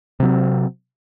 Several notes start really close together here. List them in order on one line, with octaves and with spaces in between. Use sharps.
C3 F#3 C4